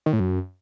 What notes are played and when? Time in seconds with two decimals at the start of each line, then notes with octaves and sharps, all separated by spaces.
0.06 D#3
0.13 A2
0.20 F#2